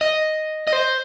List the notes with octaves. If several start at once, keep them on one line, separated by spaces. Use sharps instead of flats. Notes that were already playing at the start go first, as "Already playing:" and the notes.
D#5
D#5
C5